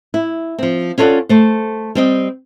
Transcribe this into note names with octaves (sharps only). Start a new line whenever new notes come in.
E4
F3 C4
C#4 F4 A4 A#4 D5 F#5
A3 C5
G3 C4 D#5